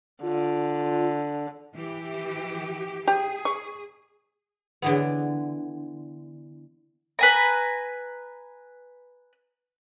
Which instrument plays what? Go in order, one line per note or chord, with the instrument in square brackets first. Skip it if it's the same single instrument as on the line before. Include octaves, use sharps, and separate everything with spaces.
[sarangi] D3 [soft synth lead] F4
[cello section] E3 G4
[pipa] G4 [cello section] G#4
[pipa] C#6
[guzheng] D3 E3 B3
[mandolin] B4 G#5 A#5